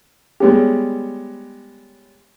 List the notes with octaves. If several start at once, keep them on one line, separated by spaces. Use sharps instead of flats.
G3 G#3 B3 C#4 G4